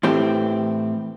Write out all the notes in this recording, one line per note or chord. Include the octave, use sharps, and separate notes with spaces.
A2 E3 C4 G4